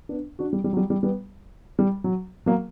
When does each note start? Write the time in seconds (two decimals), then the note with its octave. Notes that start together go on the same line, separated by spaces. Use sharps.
0.09 B3 D4
0.39 D4 F#4
0.53 G3
0.64 G3
0.73 F#3
0.77 G3
0.90 G3
1.03 G3 B3
1.79 G3
2.04 F#3
2.46 F#3 A#3